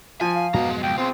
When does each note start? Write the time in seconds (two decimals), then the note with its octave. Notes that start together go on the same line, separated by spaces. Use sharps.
0.21 F3 G#5
0.36 F5
0.54 F2 G#2 B2 F#3 B3 A#5
0.70 G#3
0.83 C#2 G5
0.98 C4 F4 G#4